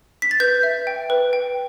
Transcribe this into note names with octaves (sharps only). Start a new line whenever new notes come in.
B6
A6
B4 G6
E5
G5
B4
G5